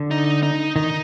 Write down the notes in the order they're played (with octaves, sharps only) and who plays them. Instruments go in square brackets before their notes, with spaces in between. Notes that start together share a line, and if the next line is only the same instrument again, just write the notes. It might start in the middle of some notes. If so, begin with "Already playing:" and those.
Already playing: [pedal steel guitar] D3
[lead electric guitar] D#4
D#4
[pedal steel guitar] D#3 [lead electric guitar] D#4